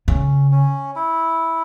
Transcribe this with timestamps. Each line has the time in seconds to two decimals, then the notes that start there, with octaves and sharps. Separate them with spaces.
0.08 C#3 C#4
0.51 C#4
0.96 E4